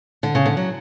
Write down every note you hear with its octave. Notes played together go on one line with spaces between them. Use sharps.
D3
C#3
D3
F#3